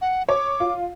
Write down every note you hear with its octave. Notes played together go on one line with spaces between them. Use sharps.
F#5
C#5 D6
F4